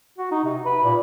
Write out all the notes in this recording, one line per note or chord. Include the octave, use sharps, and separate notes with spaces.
F#4
D#4
C3
B4
A#2